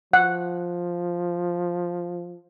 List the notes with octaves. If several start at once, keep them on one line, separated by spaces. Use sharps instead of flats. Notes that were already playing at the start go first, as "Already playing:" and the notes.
F3 F#5